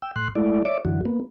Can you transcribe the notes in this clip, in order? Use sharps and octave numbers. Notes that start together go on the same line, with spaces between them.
G5 E6
A2 C6 F#6
G#3 A3 E4 D5
C#5 D5 E5 D6
F#2 D3 E3 F#4
A#3 B3